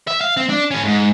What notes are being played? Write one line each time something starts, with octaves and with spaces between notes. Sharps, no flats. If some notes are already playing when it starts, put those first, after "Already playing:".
E5
F5
C4
D4
A2 C#4
G#2